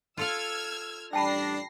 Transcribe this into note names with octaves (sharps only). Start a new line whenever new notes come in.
F4 A4 F5 E6 F6 G#6
A1 G3 D4 G5 A5 B5 A#6 C7